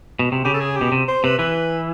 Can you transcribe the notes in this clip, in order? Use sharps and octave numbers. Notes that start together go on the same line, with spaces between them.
B2
C3
C#3 G4
A4
G#4
G4
B2
C3
C5
C3 B4
E3 B4